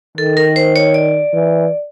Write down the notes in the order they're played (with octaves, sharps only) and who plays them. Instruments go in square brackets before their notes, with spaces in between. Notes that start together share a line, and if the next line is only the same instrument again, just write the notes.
[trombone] D#3 [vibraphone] A4
[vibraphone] A#4
C5
C#5
D5
[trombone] E3